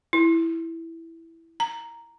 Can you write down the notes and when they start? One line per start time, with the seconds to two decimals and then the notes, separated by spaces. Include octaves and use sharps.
0.13 E4
1.60 A#5